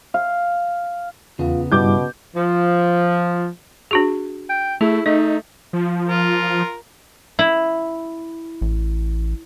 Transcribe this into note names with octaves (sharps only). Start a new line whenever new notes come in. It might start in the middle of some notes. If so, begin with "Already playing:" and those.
F5
E2 C#3 B3 F4
G2 B2 G3 E4 D6 G6
F3
D4 F#4 G#4
G5
A3 E4 G#4 E5
A3 D#4 D#5
F3
F4 A#4
E4
A1